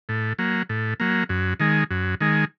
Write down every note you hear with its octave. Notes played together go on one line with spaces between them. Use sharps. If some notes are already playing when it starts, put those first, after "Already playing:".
A2
F#3 A#3
A2
F#3 A#3
F#2
D#3 G#3
F#2
D#3 G#3